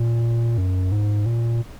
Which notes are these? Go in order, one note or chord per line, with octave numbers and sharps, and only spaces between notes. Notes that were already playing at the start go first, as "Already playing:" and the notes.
Already playing: A#2
F#2
G#2
A#2